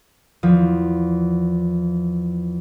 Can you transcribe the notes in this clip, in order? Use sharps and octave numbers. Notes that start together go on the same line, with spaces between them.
E2 F3